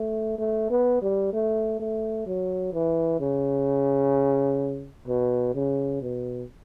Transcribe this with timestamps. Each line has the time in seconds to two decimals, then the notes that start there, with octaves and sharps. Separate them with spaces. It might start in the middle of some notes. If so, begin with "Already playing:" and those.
Already playing: A3
0.39 A3
0.70 B3
1.02 G3
1.33 A3
1.80 A3
2.27 F#3
2.73 E3
3.20 C#3
5.08 B2
5.55 C#3
6.02 B2